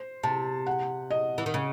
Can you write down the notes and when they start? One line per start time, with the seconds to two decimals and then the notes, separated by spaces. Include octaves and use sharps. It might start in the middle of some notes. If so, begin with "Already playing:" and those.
Already playing: C5
0.23 C3 A5
0.67 F#5
1.10 D#5
1.38 E3
1.46 D#3
1.54 C#3